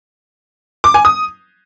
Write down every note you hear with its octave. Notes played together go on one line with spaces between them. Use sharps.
D6
G#5
D#6